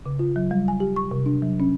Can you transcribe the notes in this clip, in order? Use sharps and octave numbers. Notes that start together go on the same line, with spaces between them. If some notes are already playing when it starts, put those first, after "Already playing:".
C#3
F4
F#3
G3
G#5
G4
C#6
C3
D4
F#3
C#4